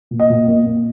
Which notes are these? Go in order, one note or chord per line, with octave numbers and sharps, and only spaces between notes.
A#2
D#5
A#2
A#3
A#3